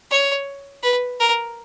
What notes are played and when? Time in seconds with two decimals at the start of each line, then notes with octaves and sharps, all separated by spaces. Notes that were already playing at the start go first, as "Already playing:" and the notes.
0.11 C#5
0.83 B4
1.20 A#4